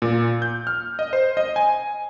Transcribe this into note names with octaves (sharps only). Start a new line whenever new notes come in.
A#2
G6
F6
D#5
C5
D#5
G#5